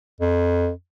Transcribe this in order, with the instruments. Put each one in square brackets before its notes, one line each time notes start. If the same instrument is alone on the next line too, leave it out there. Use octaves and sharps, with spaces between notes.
[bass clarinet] F2